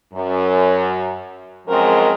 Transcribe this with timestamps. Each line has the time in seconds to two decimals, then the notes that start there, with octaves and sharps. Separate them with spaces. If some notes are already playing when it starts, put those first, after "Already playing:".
0.14 F#2
1.68 F#2 F3 G#3 C4 A#4